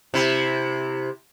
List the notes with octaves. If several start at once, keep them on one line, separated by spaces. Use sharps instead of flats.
C3 E4